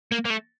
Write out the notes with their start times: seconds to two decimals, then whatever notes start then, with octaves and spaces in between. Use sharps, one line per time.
0.12 A#3
0.25 A#3
0.30 A3